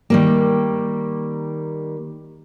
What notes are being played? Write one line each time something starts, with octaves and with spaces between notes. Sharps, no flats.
D#3 G3 A#3